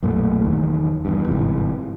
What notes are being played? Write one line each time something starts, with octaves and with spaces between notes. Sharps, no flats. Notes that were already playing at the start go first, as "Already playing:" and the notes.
B1 F#2 A#2 A3
F#1 E2 D#3
E2 G2
G1 G#2 C3 E3